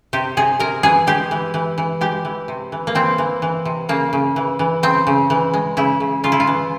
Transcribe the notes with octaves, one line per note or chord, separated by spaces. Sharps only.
C3 G4
C3 G#4
C3 A#4
E3 G#4
G#3 G4
E3
E3
E3
G#3 G4
E3
C3
E3
A#3
E3 C4
E3
E3
C3
C#3 A#3
C#3
E3
E3
C#3 C4
C#3
E3
G#3
C#3 E4
C#3
C#3 F4
E4
F4
E3